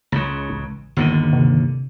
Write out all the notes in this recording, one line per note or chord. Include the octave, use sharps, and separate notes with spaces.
C#2 C#3
A1
G1 D#2 D3
C3